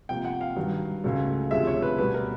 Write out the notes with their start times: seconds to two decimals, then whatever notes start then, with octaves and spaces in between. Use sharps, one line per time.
0.09 C3 F3 A#3 G5
0.25 F#5
0.41 F5
0.56 G2 D#3 F#3
1.04 C#2 C#3 F#3 A3
1.51 D2 C3 F3 G#3 E5
1.67 C#5
1.82 B4
1.98 B2 G3 B3 B4
2.14 A#4